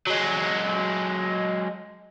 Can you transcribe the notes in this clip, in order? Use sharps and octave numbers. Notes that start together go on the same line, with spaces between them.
F#3 G#3